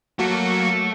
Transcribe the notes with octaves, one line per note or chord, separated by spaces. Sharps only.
F#3 A3 A#3 F#4 A4